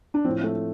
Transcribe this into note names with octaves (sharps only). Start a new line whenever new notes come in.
D4
A2 F3 C4
A3